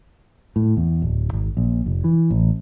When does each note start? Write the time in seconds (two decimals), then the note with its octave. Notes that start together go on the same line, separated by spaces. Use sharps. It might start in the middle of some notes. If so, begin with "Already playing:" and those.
0.56 A2
0.77 E2
1.02 D1
1.33 G#1
1.57 A#1
1.86 F1
2.04 E3
2.31 A1